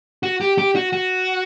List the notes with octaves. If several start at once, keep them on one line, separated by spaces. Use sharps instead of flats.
F#4
G4
G4
F#4
F#4